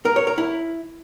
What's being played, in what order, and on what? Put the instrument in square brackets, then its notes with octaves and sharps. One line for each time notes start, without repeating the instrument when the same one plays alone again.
[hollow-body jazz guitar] A#4
C#5
A#4
E4